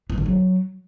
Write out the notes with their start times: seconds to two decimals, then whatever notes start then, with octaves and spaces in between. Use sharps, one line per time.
0.10 E3
0.18 D3
0.26 F#3